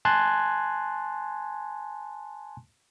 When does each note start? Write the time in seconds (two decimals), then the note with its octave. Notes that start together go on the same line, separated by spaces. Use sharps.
0.05 G#5 A5 C6 F#6 G#6